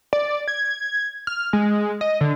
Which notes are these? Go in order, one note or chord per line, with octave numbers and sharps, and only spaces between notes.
D5
G#6
F6
G#3
D#5
D3